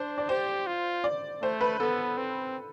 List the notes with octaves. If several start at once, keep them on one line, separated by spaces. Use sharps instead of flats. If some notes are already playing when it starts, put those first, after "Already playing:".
Already playing: D4 C5
D5
G4 C5
F4
D5
A3 C5
B4
B3 A4
C4